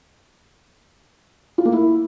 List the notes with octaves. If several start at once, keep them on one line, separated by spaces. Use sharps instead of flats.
F4
A#3
E4